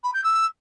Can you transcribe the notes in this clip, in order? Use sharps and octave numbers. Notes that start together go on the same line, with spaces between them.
B5
G6
E6